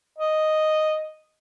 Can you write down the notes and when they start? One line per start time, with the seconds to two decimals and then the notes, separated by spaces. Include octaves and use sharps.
0.18 D#5